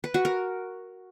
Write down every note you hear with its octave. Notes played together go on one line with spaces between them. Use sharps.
B4
F#4
A#4